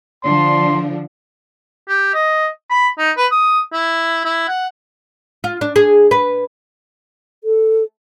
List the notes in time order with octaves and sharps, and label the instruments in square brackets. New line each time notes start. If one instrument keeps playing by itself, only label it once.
[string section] D3 F3 D4 [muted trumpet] C6
[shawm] G4
D#5
B5
D#4
B4
D#6
E4
E4
F#5
[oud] F4
D4
G#4
B4
[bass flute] A4